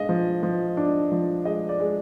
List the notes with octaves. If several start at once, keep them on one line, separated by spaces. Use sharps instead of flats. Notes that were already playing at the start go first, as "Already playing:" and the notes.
Already playing: G#3 D4 D#5 F5
F3
F3
D4
F3
G#3 D#5
D5
G#3